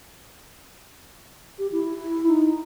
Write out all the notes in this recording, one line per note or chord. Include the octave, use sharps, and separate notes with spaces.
G4
E4
D#4